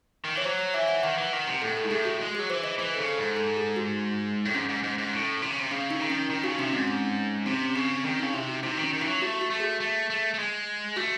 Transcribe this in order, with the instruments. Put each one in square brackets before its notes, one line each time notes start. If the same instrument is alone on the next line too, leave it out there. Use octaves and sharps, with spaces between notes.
[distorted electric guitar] D#3
[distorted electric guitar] E3 [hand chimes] C#5
[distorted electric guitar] F#3 [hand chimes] C5
[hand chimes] C#5
[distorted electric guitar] E3 [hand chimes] E5
[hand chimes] F#5
[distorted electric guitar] D#3 [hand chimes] F#5
[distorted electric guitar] E3
D#3
C3
[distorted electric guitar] A2 [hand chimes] A4
[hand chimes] A4
[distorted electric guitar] G#2
[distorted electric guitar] A2 [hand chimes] G#4
[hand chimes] F#4
[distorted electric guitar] G#3
[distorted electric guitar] F#3 [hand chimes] G#4
[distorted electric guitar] E3 [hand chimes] C5
[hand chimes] D#5
[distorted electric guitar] E3 [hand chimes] C5
[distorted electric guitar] C#3 [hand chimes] A4
[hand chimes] A4
[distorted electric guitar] G#2
[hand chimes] A4
G#4
F#4
[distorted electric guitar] A2
[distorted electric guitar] G#2 [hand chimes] C#4
[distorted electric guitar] G#2
G#2
G#2
A2
C3
C#3
C3
[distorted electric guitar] C#3 [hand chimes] C#4
[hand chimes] D#4
[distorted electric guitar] D#3
[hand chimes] C#4
[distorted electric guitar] D#3 [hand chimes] D#4
[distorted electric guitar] C#3 [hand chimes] F#4
[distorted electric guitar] C3 [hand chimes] C#4
[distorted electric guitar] G#2 [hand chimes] C4
[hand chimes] C#4
[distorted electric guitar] C3 [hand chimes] C4
[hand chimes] C#4
[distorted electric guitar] C#3 [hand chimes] C4
[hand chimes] C4
[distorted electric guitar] D#3 [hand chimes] C#4
[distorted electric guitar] C#3 [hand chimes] D#4
[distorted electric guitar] C3 [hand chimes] E4
[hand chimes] F#4
[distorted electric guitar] C3 [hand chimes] D#4
[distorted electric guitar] D#3
[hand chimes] C#4
[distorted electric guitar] D#3
[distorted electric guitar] E3 [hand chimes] E4
[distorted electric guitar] F#3
[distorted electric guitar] A3 [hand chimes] F#4
[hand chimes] F#4
[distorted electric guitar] A3
[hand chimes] G#4
[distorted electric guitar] A3
A3
A3
G#3
[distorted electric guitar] A3 [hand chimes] F#4